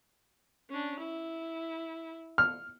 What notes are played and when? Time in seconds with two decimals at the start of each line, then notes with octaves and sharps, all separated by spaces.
0.69 C#4 D4
0.99 E4
2.38 F6